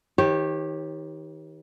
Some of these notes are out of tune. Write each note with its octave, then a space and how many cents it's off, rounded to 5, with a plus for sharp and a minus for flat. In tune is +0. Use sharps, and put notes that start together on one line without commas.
D#3 +35 G4 +0 C#5 -30